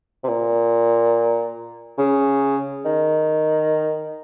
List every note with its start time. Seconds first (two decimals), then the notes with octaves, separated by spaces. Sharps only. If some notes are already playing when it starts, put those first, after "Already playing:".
0.24 C3
0.29 A#2
1.99 C#3
2.85 D#3